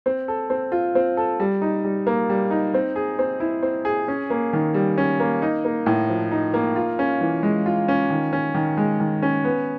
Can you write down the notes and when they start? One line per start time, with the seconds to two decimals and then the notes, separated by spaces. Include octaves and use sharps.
0.06 C4
0.28 A4
0.50 C4
0.72 F4
0.95 C4
1.17 A4
1.40 G3
1.62 D#4
1.85 G3
2.07 A#3
2.30 G3
2.51 D#4
2.74 C4
2.96 G#4
3.19 C4
3.40 E4
3.63 C4
3.85 G#4
4.08 C#4
4.30 A#3
4.53 D#3
4.74 G3
4.98 C#4
5.20 A#3
5.42 D#4
5.65 A#3
5.86 A2
6.09 F3
6.32 D#4
6.54 A#3
6.76 F4
6.99 C#4
7.21 E3
7.43 G#3
7.66 F4
7.88 C#4
8.10 D#3
8.33 C#4
8.55 D#3
8.77 G#3
9.00 D#3
9.22 C#4
9.44 B3